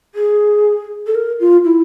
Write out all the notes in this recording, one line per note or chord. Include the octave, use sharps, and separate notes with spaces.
G#4
A4
A#4
F4
E4